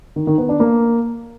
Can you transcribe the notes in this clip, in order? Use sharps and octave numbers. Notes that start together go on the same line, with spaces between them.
D#3
D#3
B3
D4
A#3